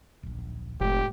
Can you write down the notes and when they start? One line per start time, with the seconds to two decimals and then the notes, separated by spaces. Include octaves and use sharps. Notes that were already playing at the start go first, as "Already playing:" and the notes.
0.23 D1 A#1
0.80 F1 A2 G#3 A3 G4